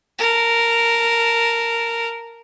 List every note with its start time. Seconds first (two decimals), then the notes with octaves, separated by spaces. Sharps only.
0.19 A#4 A5